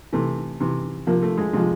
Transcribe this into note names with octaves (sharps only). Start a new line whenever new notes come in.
C3 E3 A3
C3 E3
C3 F3 A#3
A3
G#3
C3 F3 G#3